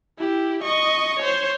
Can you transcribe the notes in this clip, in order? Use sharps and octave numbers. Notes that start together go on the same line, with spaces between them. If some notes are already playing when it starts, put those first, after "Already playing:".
E4 G4
D#5 C#6
C5 C#5